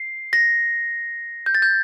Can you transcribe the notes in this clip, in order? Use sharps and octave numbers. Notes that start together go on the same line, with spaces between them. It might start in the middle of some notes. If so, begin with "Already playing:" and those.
Already playing: C7
A#6
G6
A6
G6